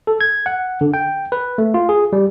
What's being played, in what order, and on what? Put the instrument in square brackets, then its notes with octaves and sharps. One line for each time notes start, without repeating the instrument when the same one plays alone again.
[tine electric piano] A4
G#6
F#5
D3
G5
B4
A3
F4
G#4
G3